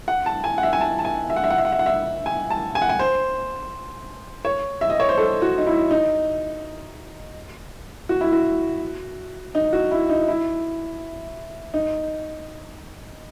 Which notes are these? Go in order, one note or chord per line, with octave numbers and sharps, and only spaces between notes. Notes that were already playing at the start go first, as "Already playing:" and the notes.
F#5
A5
G#5
F#5
E5
G#5
A5
A5
G#5
E5
F#5
E5
F#5
E5
F#5
E5
F#5
E5
G#5
A5
G#5
F#5
G#5
C5
C#5
E5
D#5
C#5
C5
A4
F#4
D#4
E4
D#4
F#4
E4
F#4
D#4
F#4
E4
D#4
E4
D#4